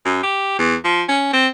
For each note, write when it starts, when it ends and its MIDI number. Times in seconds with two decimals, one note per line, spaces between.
0.05 0.20 42
0.23 0.54 67
0.59 0.75 40
0.85 1.02 53
1.08 1.31 61
1.33 1.47 60